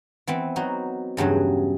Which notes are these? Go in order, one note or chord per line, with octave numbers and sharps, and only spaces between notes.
E3 B3 C4
F#3 D#4 F#4
E2 G2 C#3 F#3